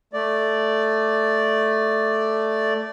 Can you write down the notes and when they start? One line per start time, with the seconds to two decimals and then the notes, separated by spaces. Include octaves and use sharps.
0.13 A3 D5